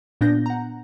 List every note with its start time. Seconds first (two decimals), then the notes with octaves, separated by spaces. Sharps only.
0.21 A#2 B3 D4 G6 A#6
0.46 F#5 A#5